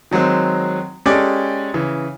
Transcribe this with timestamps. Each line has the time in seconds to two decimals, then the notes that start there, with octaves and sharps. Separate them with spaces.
0.11 D#3 F#3 G#3 C4
1.06 G#3 C#4 G4 A4 D5 G#5
1.74 C#3 E3